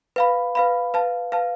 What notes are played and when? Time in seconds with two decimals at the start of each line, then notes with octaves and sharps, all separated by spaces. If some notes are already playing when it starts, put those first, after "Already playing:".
0.16 B4 F5 B5
0.55 B4 F5 B5
0.94 B4 F5 A5
1.32 B4 F5 A5